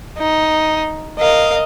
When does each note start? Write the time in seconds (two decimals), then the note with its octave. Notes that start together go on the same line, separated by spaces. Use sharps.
0.18 D#4
1.19 A#4 D#5 F5